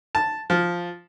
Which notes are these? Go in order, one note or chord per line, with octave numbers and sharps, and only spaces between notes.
A5
F3